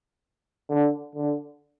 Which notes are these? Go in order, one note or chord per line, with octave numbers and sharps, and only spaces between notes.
D3
D3